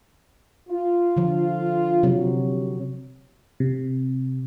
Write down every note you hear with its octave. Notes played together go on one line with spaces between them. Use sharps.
F4
D3 F3
C3 F#3
C3